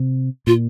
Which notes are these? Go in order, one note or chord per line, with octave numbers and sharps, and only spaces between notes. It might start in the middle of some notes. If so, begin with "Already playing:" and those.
Already playing: C3
A#2 F4